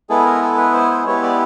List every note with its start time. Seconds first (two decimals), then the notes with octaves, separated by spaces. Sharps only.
0.10 G#3 B3 E4 G#4 A4
0.26 A#4
0.42 A4
0.57 B4
0.74 C5
0.91 C5
1.06 G#3 B3 E4 G4 C#5
1.23 D5